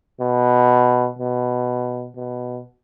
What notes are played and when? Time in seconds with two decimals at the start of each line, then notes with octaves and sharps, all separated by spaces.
0.20 B2
1.19 B2
2.16 B2